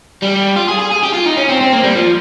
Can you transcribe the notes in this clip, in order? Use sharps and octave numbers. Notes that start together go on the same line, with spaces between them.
G3
F4
G#4
G#4
G#4
G4
F4
D#4
C#4
C4
C4
A#3
G3
F3